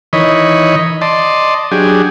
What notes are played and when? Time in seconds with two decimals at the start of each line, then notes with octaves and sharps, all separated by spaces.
0.13 D#3 E3 C#5 D#5 B5
1.01 D5 D#5 A5 C6
1.71 F#3 D4 G4 G#4